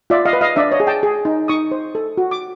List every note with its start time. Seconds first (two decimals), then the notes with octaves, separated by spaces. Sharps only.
0.10 F4 D5 E5
0.25 D#5 F5
0.33 B4
0.41 D#5 F5
0.56 D4 D5 E5
0.71 C#5 D#5
0.80 G#4
0.87 G5 A5
1.03 G#4
1.25 D#4
1.48 D#4 C#6 D#6
1.71 C5
1.95 A4
2.18 F#4
2.31 D6